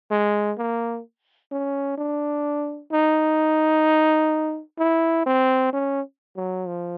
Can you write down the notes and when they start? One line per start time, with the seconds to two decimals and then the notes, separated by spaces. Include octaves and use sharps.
0.11 G#3
0.58 A#3
1.52 C#4
1.97 D4
2.92 D#4
4.79 E4
5.26 C4
5.73 C#4
6.36 F#3
6.67 F3